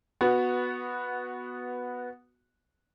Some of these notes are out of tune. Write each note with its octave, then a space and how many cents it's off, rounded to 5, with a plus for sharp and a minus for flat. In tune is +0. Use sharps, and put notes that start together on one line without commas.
B3 +0 F#4 -10 B4 -10